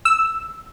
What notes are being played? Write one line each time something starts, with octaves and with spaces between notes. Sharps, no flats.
E6